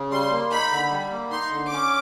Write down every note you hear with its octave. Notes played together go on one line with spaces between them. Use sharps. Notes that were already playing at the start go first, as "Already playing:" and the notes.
Already playing: C#3
G3 C6
A#3
D#4 B5
D3
G3
A#3
D#4 C6
D3
C#4 D6